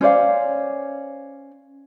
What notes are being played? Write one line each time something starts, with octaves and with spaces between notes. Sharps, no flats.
C#4 C5 D5 F5